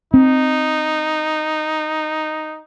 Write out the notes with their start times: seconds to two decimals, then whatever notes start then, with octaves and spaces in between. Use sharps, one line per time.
0.14 C4 D#4